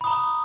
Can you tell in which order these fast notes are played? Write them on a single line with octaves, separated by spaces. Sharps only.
B5 D#6 A#5